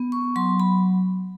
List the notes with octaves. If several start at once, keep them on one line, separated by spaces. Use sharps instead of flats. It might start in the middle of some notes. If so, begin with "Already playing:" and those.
Already playing: B3
C#6
F#3 C6
B5